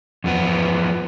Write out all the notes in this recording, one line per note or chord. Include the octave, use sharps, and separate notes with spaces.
E2 F3 B3